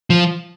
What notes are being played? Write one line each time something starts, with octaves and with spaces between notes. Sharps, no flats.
F3